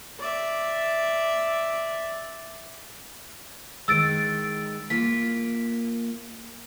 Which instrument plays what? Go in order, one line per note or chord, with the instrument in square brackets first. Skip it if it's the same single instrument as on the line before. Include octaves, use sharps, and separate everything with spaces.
[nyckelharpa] D5 E5
[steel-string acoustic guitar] D#3 G#3 [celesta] E6 A6 D7
[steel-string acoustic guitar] A#3 F4 [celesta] B6